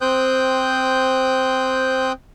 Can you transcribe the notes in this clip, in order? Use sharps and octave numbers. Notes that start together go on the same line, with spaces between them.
C4 C5 G5 D#6 F#6 G6